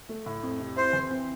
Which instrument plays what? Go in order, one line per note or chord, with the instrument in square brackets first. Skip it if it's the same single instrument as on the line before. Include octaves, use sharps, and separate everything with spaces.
[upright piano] A3
A2
F2
C3
[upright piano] E4 [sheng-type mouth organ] C5
[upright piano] E3
C4